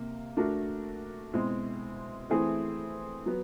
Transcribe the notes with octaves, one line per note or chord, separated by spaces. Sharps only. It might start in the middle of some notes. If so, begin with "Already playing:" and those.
Already playing: C3 A#3
A3 D4 F#4 A#4
B2 G#3 C4 E4
E3 A3 C4 E4 G#4
F#3 B3